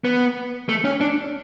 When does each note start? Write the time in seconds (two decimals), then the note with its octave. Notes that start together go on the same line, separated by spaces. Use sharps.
0.04 B3
0.69 A3
0.85 C#4
1.01 D4